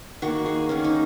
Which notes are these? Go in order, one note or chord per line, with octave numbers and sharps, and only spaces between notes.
D#3 A#3 F#4
G#4
D#3 A#3 C#4
D#4